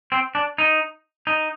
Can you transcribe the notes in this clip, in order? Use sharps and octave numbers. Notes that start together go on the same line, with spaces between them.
C4
D4
D#4
D#4